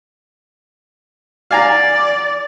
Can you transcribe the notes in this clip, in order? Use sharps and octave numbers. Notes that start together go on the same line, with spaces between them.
D5 F5 G#5 A#5